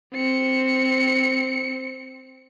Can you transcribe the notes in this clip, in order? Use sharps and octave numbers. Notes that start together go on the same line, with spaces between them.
C4 C#7